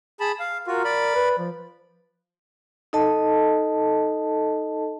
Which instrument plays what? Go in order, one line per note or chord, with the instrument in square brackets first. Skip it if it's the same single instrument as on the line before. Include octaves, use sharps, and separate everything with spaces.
[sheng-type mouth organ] G#4 A5 B5
F5
[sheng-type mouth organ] F4 F#4 [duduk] A#4
[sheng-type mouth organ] D5 B5
[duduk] B4
F3
[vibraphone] D#4 A4 D#5 A5